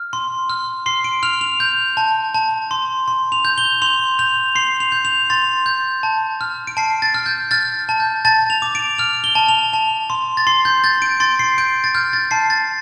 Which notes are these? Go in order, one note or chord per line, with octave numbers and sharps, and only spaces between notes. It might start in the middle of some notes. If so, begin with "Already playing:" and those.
Already playing: F6
C6
F6
C6 C7
D7
F6 F7
F7
G6
A5
A5
C6
C6
F7
G6
G7
C6 F7
G6 F7
C6 C7
F7
G6
F7
C6 A6
G6
A5
F6
D7
A5 C7
A6
F6
G6
F6 A6
A5
G6
A5 A6
F7
D6
D7
F6 F7
G7
A5
F7
A5
C6
A6
C6 C7
G6
G6 A6
D7
C6 A6
C7
G6 D7
A6
F6 G6
A6
A5 C7
A6